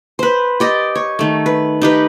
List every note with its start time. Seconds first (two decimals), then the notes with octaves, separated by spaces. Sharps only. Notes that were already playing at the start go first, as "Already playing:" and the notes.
0.19 B4 C5
0.60 G4 D5 D#5
0.95 C#5
1.19 D#3 A3
1.46 B4
1.82 D#4 G4 B4